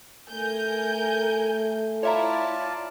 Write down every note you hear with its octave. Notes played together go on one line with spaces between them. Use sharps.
A3 A#4 G#5 G6
E4 F4 C#5 D5 E5 A5 A#5